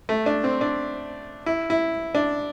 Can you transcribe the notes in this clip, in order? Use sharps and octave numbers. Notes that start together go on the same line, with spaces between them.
A3
D4
C4
D4
E4
E4
D4